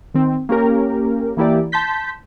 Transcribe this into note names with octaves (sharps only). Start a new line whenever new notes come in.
D#3 C4
A#3 C#4 G4 A#4
E3 A#3 E4 G4 D5
A5 C6 G6 B6